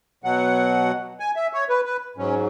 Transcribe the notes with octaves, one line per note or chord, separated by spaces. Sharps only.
B2 F#3 F#5
G#5
E5
C#5
B4
B4
G#2 F#3 C#4